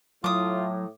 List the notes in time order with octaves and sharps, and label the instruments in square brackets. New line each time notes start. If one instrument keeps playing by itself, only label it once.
[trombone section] A2 [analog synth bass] F#3 [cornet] F4 [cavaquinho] D6 D#6